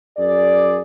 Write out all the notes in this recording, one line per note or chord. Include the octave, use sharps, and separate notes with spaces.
F#2 G#4 D5